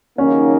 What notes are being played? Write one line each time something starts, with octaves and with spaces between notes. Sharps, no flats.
D#2 C#3 F#3 A#3 C#4 D#4